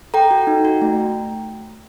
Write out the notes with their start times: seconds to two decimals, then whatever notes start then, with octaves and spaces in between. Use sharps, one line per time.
0.14 A4 G5 A#5
0.31 F#4
0.47 D#4
0.65 F#4
0.82 A3